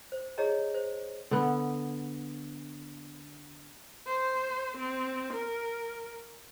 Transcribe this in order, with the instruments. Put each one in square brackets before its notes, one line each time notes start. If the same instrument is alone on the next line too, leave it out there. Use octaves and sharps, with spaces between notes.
[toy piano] C5
E4 G4 G#4 C#5 D#5 A#5
C5
[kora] D3 B3
[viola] C5
C4
A#4